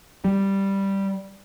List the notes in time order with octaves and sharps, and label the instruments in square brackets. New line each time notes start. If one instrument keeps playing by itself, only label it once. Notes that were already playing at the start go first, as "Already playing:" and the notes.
[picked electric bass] G3